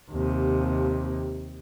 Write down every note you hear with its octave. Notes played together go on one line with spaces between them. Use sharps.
D#2 C3